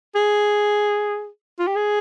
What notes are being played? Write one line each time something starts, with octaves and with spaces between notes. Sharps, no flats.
G#4
F4
G4
G#4